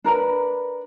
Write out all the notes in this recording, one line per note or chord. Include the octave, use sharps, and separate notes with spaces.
D4 A#4 B4 B5